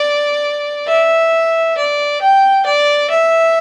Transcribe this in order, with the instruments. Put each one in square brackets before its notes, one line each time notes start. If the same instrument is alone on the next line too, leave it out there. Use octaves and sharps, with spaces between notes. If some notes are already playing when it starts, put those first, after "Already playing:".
Already playing: [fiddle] D5
E5
D5
G5
D5
E5